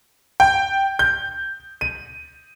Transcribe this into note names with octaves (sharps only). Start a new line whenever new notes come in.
G5
G6
D#7